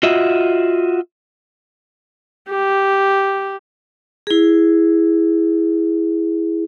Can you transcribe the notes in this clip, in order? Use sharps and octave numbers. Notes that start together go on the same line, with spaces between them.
F4 F#4 D#5 E5
G4
E4 G#4